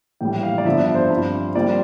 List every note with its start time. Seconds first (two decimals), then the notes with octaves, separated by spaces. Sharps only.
0.21 A#1 A2 E3 G3 G5
0.43 F5
0.58 D5
0.65 G1 G2 D3 F3 E5
0.80 D5
0.95 C5
1.10 G2 F3 C4
1.55 A#1 A#2 G3 C4 D5